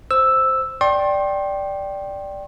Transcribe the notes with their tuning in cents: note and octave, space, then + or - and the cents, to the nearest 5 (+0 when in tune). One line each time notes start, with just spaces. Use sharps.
C5 +0 E6 +0
D5 +0 G5 -5 C6 +35